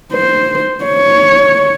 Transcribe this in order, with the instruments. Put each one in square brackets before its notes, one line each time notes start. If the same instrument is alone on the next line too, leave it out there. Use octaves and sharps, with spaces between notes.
[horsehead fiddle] C5
C#5